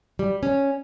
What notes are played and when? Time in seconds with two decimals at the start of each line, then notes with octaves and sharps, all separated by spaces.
0.19 G3
0.43 C#4